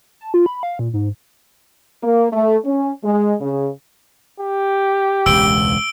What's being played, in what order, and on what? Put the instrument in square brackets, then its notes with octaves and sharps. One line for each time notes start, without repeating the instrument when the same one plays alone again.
[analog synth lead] A5
F4
B5
F5
A#2
G#2
[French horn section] A#3
A3
C#4
G#3
C#3
[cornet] G4
[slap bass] E1 C#2 [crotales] E6 D7 G7